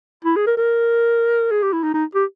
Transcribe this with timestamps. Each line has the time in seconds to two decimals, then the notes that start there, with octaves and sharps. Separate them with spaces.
0.25 E4
0.36 G#4
0.47 A#4
0.57 A#4
1.51 G#4
1.62 G4
1.73 E4
1.83 D#4
1.94 D#4
2.15 G4